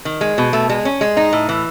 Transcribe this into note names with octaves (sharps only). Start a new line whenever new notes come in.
D#3
G#3
B2
A3
G#3
C#4
G#3
D#4
A2
E3